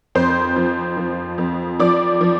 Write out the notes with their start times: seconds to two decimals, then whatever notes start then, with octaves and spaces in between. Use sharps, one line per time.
0.15 F2 C5 C6
0.56 F3
0.97 F3
1.38 F2
1.79 F3 D5 D6
2.21 F3